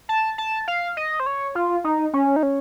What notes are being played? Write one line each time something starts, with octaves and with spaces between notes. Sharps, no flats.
A5
A5
F5
D#5
C5
C#5
F4
D#4
C#4
D#4
C#4